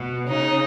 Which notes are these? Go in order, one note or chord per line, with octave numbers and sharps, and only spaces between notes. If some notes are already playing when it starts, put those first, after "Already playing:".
Already playing: B2
C#3 D#4